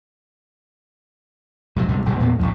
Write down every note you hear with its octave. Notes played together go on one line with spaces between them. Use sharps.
G#2 C3 F#3
D2 G#2 C3 G3
B1 G#2 D3 G3
E2 A#2 A#3 B3
A1 F2 G#2 F3